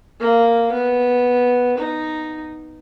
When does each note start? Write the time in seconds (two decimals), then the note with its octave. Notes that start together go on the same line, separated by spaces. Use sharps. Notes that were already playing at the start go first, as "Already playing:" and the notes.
0.20 A#3
0.72 B3
1.78 D#4